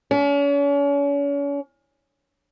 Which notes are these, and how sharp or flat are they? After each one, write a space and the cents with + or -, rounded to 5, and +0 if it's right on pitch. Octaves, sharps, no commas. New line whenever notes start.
C#4 +40